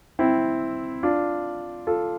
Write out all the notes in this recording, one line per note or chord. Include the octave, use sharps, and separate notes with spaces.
C4 E4
D4 F4
F4 A4